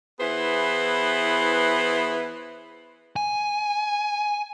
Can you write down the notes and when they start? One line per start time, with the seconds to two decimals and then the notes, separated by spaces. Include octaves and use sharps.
0.20 E3 B3 E4 G#4 B4 C5
3.16 G#5